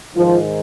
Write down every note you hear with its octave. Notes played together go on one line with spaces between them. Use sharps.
G#2 D#3 F3